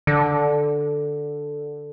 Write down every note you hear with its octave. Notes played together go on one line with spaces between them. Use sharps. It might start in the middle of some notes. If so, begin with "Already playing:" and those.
D3